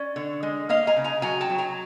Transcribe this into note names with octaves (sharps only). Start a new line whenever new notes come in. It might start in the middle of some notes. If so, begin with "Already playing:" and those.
Already playing: C#4 D5
D3
G#3
A#3 D#5 F5
G#5 A#5
C#3
G#5 A#5
F#3 G#5 A#5
G5 A5
F#3
G#5 A#5